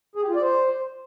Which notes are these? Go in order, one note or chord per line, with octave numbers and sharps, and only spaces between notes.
G#4
G4
F4
D5
C5